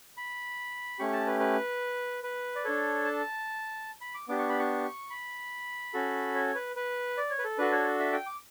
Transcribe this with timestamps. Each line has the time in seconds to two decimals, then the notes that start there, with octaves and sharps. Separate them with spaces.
0.17 B5
0.99 A3 C#4 G4 C#6
1.13 A5
1.27 B4
1.40 B4
2.23 B4
2.56 D5
2.64 D4 A4 C#5
3.05 A5
4.01 B5
4.15 D6
4.28 B3 D4 G4 D6
4.39 C#6
4.49 B5
4.59 C#6
5.10 B5
5.94 C#4 F#4 A4
6.35 C#5
6.55 B4
6.76 B4
7.17 D5
7.30 C#5
7.39 B4
7.44 A4
7.58 D4 F#4 A4 B4
7.72 C#5
8.00 E5
8.12 G5
8.26 D6